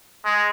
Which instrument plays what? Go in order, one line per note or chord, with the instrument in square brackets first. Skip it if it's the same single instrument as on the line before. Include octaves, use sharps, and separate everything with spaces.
[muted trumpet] G#3